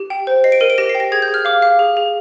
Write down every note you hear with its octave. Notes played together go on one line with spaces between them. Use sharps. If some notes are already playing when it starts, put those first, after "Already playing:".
Already playing: G4
G5
C5
D#5 C7
D7
A#4 D#7
D7
G4 A#6
C7
G5
A#6
G#4 G#6
G6
G#4
F6
F5 D6
F5
G#4
G#4